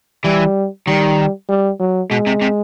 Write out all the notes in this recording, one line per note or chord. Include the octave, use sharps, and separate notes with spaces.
E3 G3
D#3 G3
G3
F#3
B2 G#3
C3
C3